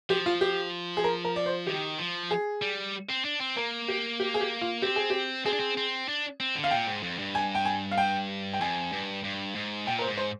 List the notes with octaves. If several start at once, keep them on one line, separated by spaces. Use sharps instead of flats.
F3 G4
F4
G4
G#4
A#4
A#4
D5
C5
D#3 G4
F3
G#4
G3
C4
D4
C4
A#3 A#4
G4
G4
G#4
G4
F4
C4 G4
G#4
G4
C4 G#4
D4
C4
C4
D4
C4
D3
F5
A#2 G5
G#2
F2
G2
G#5
G5
G#5
F5
G5
G5
F2 G#5
G2
G2
G#2
A#2 G5
A#4
C5
G#2
C5